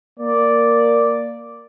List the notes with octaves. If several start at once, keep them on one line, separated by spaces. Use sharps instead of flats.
A#3 D5